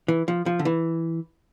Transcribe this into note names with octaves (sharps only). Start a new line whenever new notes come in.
E3
F3
F3
D3
E3